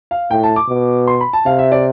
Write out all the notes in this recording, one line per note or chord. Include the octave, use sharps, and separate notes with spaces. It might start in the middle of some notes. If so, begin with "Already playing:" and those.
F5
A2 G5
A5
D6
B2
C6
B5
A5
C3 F5
E5
D5